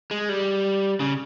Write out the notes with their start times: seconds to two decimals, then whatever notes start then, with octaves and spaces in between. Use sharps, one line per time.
0.11 G#3
0.29 G3
1.00 C#3